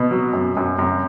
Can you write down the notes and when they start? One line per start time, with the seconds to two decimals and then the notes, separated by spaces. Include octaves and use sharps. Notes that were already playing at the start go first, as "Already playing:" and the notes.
Already playing: B2
0.11 F#3
0.33 F#2
0.57 F#2
0.79 F#2